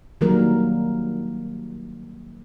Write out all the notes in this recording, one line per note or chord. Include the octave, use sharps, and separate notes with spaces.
D#3 F#3 G3 A#3 A#4